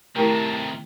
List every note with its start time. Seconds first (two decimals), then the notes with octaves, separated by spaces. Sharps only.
0.16 C3 D#3 A3 E4 G4 A#4 A5